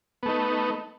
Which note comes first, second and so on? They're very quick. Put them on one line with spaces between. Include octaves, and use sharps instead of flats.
B3 A3 D#4